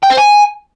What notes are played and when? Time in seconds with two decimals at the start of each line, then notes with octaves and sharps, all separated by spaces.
0.03 G5
0.10 C5
0.18 G#5